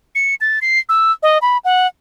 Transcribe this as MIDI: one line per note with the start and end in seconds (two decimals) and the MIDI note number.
0.15 0.35 97
0.41 0.59 93
0.61 0.79 96
0.89 1.12 88
1.23 1.38 75
1.42 1.57 83
1.64 1.87 78